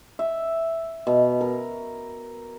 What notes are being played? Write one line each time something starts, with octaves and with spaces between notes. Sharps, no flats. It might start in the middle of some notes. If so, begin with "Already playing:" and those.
E5
B2
A#4